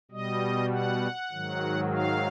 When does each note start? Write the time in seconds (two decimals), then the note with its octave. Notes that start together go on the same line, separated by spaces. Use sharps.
0.11 B2 G3 D#5
0.71 F#5
1.31 G#2 D#3 F#3
1.92 F5